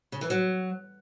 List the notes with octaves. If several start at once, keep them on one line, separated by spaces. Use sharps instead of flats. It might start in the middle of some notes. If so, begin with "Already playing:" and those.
C#3
E3
F#3